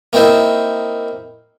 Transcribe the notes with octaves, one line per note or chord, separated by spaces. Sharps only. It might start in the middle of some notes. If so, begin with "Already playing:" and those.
A#3 C4 D#4 E4 C5